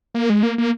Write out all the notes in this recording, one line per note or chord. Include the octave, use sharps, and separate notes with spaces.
A#3
G#3
A#3
A#3